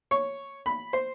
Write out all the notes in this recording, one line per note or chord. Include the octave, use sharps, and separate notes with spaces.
C#5
B5
C5